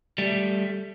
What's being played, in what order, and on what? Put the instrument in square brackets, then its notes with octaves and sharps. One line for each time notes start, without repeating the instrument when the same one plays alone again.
[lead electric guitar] G3 A3